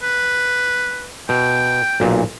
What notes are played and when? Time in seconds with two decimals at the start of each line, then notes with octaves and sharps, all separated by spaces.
0.02 B4
1.29 B2 G5
2.00 B1 A#2